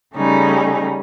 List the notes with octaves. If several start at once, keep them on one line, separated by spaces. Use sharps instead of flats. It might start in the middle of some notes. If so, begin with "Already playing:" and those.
C#3 G3 A3 C#4 D#4